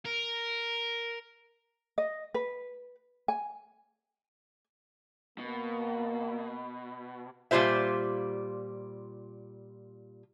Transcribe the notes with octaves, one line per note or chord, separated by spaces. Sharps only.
A#4
D#5
B4
G#5
B2 A#3
A#2 G3 F4 C5 E5